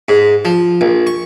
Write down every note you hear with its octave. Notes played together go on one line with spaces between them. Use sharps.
G#2
F3
A#1
C#6